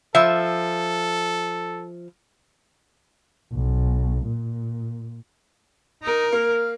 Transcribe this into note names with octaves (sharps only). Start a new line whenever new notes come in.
F3 A4 E5
B1
A#2
D#4 A#4
A#3 F5